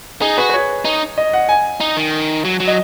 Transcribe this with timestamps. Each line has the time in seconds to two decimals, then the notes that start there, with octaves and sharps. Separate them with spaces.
0.21 D#4 G#4
0.37 F#4 B4
0.50 B4
0.54 C#5
0.85 D#4
1.18 D#5
1.33 F#5
1.49 G#5
1.80 D#4
1.97 D#3
2.45 F#3
2.60 F#3
2.68 D#5